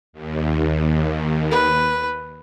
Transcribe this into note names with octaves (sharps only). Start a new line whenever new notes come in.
D#2
B4